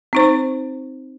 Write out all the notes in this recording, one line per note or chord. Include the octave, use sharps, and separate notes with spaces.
C4 D#4 C5